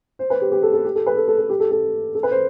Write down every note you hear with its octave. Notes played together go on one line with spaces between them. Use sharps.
C5
B4
G4
G4
A4
A4
G4
A4
B4
A4
A4
A4
G4
A4
A4
A4
B4
C5